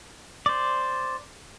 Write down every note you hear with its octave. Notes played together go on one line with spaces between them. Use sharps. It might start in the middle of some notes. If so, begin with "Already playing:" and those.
C5 D5